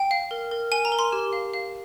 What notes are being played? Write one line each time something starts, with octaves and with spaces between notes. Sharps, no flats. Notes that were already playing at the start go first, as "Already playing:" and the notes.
Already playing: G5
F5
A#4
A#4
A#4 G#5
A#5
A#4
C6
G4
F5
F5